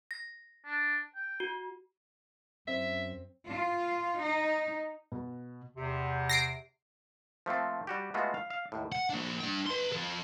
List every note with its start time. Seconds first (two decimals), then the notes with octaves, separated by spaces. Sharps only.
0.11 A#6
0.66 D4
1.15 G5
1.40 F#4
2.67 F#2 C4 E5
3.46 F4
4.20 D#4
5.12 B2
5.77 E2 C3
6.30 A#6 C7 D7
7.46 F3 A3 A#3 C4
7.87 G3 F#4 G4
8.14 G#3 A3 B3 F4 F#4
8.34 F5
8.50 F5
8.72 D#2 A2
8.92 F#5
9.10 A#3 D4
9.40 D4 G5
9.67 B4 C6
9.93 F3 A4